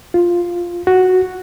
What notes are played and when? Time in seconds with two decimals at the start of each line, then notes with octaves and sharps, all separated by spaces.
0.14 F4
0.87 F#4